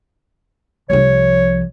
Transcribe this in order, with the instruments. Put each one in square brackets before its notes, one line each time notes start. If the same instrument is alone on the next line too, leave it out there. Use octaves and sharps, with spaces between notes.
[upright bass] C2 F3 [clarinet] C#5